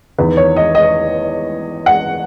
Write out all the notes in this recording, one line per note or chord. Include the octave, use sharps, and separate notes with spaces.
E2 D#3 B4
C#5
D#5
D#5
F#5